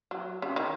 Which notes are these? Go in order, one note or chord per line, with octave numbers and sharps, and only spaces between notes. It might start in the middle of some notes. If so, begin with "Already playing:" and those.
F#3
C#3
D#3